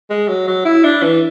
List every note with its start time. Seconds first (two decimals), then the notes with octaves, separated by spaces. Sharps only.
0.10 G#3
0.28 F#3
0.47 F#3
0.65 E4
0.84 D4
1.03 E3